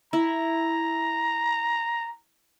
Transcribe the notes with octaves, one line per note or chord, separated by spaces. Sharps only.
E4 A#5